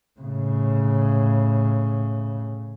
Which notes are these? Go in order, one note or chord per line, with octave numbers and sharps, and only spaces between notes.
A2 C#3